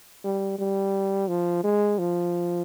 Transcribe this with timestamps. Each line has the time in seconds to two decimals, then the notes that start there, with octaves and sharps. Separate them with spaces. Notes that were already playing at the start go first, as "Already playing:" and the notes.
0.24 G3
0.59 G3
1.28 F3
1.64 G#3
1.99 F3